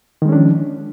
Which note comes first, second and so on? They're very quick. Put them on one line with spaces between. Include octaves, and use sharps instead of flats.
D#3 G#3 C#4 D4 F3